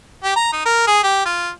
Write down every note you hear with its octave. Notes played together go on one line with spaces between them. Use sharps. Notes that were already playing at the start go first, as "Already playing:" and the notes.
G4
A#5
D#4
A#4
G#4
G4
F4